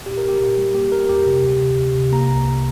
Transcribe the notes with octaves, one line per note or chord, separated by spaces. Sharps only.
A#2 G4
A#4
A#3
G4
A#2
G3
A#3 G4
A#3 A#4
F2 G4
C3
D2
C3
D2
C3
A#3 A#5
C2